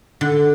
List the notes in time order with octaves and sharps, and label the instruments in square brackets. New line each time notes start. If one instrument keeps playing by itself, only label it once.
[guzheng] D3